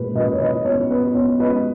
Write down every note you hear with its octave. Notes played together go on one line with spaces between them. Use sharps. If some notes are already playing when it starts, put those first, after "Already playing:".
Already playing: A#2 G#3 B4
A#2 B4 D#5
C#5
A#2 B4 D#5
B3 C#5
B3 B4
B3 C#5
G#3 B4 D#5